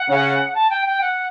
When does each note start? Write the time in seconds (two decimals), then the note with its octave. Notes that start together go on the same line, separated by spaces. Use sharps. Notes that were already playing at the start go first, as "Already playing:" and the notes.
Already playing: F#5
0.09 C#3
0.55 A5
0.70 G5
0.86 G5
1.01 F#5